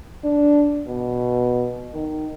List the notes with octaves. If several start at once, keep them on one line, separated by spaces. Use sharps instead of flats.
D4
B2
D#3